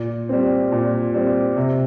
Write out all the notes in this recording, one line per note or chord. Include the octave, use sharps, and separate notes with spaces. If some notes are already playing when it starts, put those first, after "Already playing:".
Already playing: A#2
G3 C4
A#2
G3 C4
C3